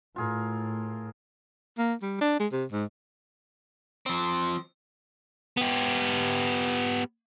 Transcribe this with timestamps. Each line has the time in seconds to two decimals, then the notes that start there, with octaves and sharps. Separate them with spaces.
0.16 A2 F4 G#4 A#4
1.78 A#3
2.02 G3
2.21 D4
2.39 G#3
2.52 C3
2.72 G#2
4.06 F3 C4
5.57 B3 G4